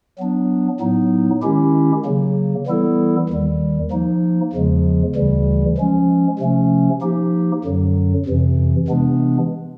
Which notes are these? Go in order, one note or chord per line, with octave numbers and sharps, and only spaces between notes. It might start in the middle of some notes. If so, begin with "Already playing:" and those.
F#3 B3 D4
A2 F#3 B3 D#4
D#3 G#3 C#4 E4 G4
C#3 F#3 A#3
E3 G3 B3 E4 A4
D#2 D#3 G3
F3 A#3 D#4
E2 C#3 F3 G#3
D2 C#3 E3 G3
F3 G#3 C#4
C3 F3 A3 C#4
F3 A#3 D#4 G4
F#2 D3 F#3
F2 C3 E3
C3 E3 G#3 B3 D4